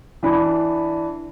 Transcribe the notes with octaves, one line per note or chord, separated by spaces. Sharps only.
E3 D4 B5